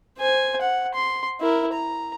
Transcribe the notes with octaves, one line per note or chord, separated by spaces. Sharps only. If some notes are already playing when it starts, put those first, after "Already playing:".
C5 G#5
F#5
C6
E4 A#4
A#5